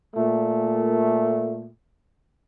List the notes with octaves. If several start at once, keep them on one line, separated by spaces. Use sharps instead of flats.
A#2 A3